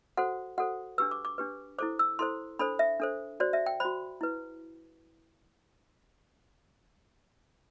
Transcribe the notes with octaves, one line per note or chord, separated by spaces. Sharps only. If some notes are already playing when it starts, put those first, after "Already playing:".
F#4 A4 C5 F#5
F#4 A4 C5 F#5
D4 G4 B4 E6
D6
D6
D4 G4 B4
E4 A4 C5 D6
E6
E4 A4 C5 C6
D4 A4 C5 B5
E5
D4 A4 C5
F#4 C5 D5
E5
G5
F#4 C5 B5
E4 B4